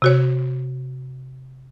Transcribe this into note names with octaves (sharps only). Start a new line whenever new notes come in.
C3 F#4 C#5